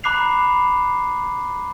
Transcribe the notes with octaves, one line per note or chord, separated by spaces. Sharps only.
A#5 B5 D6 F#6 C7 F7